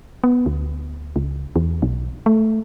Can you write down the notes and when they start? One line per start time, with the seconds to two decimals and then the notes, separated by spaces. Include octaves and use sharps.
0.24 B3
0.46 D2
1.16 C#2
1.56 E2
1.82 B1
2.26 A3